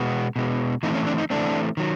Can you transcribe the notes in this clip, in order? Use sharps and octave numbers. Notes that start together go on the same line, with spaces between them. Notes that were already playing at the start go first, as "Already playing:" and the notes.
Already playing: B2 G#3 B3
B2 G#3 B3
E3 A3 C4 D#4
C#4
D4
D#4
E3 A3 C4 D4
D#3 F#3